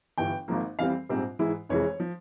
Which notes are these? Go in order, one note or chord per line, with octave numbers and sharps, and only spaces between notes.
G1 G2 E3 G5
G#1 G#2 F3 A#3
F2 E3 G3 C4 F5
A#1 G#2 G3 C4
G#2 E3 G#3 E4
F1 F2 E3 G#3 C#5
F3